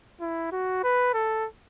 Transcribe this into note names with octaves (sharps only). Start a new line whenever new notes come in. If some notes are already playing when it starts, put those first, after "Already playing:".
E4
F#4
B4
A4